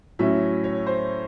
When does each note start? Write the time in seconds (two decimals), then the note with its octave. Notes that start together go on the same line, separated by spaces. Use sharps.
0.19 A2 F#3 C#4 E5
0.64 C#5
0.86 C5